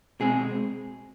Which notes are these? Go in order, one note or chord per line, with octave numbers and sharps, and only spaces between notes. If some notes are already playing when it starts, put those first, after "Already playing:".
B2 G#3 C4 G#4